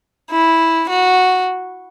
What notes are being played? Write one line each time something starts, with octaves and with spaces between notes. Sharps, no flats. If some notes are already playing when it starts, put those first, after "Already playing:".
E4
F#4